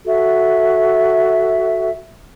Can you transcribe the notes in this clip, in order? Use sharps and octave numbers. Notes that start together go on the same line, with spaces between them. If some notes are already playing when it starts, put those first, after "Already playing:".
F#4 A4 E5